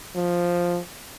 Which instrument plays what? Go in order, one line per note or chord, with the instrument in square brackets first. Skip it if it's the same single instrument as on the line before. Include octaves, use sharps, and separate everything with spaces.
[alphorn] F3